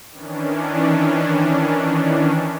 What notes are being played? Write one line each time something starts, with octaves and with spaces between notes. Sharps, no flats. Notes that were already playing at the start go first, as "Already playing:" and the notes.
D#3 E3 C#4 D4